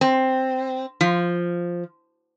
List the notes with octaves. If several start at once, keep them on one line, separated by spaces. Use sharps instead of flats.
C4
F3